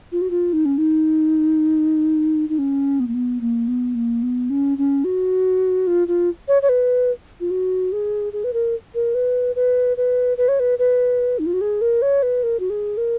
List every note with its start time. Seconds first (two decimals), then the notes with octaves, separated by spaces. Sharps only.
0.12 F4
0.21 F#4
0.30 F4
0.53 D#4
0.65 C#4
0.78 D#4
2.49 D#4
2.58 C#4
3.00 B3
3.07 A#3
3.14 B3
3.41 A#3
3.68 B3
3.95 A#3
4.23 B3
4.50 C#4
4.78 C#4
5.04 F#4
5.87 F4
6.08 F4
6.48 C#5
6.62 C#5
6.69 B4
7.40 F4
7.51 F#4
7.92 G#4
8.33 G#4
8.44 B4
8.53 A#4
8.95 A#4
9.15 B4
9.56 B4
9.97 B4
10.37 B4
10.48 C#5
10.60 B4
10.79 B4
11.39 D#4
11.46 F4
11.53 F#4
11.61 G#4
11.81 A#4
12.02 C#5
12.23 B4
12.43 A#4
12.60 F#4
12.70 G#4
12.97 A#4